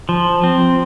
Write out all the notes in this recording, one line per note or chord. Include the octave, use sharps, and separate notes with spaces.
F3
C4